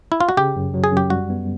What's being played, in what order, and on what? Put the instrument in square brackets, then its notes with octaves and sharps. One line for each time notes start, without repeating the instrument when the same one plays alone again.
[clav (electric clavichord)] E4
F4
F#4
[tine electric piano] C#3 [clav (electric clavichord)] G4
[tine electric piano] F#2
F#3
[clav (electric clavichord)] G#4
[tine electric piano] F#2 [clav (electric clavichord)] G4
[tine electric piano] G3 [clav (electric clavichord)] F#4
[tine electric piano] B3